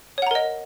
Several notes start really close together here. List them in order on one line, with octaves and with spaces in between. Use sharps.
C#5 F#5 A#5 A#4 D#5